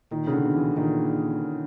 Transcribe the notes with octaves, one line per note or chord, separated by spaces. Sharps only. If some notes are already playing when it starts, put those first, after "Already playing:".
A#2 D#3
C#3
D3
B2
E3
A#2 D#3